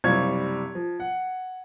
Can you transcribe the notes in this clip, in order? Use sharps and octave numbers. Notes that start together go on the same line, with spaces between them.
F#1 C3 G3 F5 C#6 G#6
F3
F#5